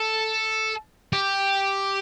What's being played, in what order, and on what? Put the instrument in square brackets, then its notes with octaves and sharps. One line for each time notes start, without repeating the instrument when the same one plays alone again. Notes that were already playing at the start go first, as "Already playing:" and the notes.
Already playing: [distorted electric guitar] A4
G4